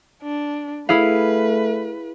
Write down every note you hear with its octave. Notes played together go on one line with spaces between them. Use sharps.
D4
A3 E4 G#4 B4 F5